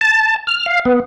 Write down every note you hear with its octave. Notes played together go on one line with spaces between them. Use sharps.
A5
F6
F5
B3